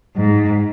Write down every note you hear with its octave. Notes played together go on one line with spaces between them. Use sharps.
G#2